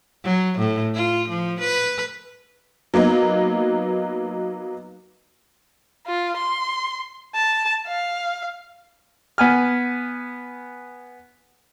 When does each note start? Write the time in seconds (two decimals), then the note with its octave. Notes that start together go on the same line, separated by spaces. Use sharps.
0.24 F#3
0.58 A2
0.94 F4
1.28 F3
1.60 B4
2.94 F#3 A#3 B3 D#4
6.07 F4
6.37 C6
7.35 A5
7.87 F5
9.38 B3 G#5 F6